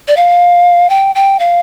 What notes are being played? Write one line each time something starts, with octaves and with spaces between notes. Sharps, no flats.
D5
F5
G5
G5
F5